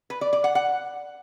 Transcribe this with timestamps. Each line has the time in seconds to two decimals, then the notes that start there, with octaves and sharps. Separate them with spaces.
0.10 B4
0.21 D5
0.33 D5
0.44 F#5
0.55 F#5